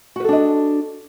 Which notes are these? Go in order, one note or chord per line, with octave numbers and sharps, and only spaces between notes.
D4 F#4 A4 B4 D#5